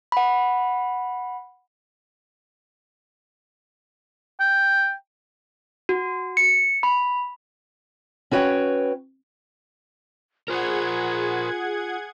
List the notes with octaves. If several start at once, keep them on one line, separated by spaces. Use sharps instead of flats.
F#5 B5
G5
F#4
C#7
B5
C#4 F#4 B4 C#5 G5
F4 G#4 A#4 C5 F#5 G#6